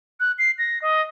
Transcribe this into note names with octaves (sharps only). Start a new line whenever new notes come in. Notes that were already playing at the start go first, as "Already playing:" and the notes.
F#6
C7
A#6
D#5